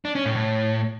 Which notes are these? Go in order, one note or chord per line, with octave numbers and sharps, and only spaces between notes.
D4
C#4
A2
A2